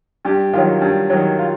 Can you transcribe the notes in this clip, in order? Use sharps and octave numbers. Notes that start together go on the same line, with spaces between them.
G2 G4
D#3 F#3 F4
G2
D#3 F#3
F4